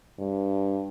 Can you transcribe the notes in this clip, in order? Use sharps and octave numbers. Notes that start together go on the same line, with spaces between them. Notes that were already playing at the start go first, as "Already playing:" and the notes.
G2